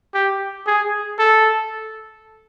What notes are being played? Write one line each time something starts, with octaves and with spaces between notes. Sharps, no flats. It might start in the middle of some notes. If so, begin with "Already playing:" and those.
G4
G#4
A4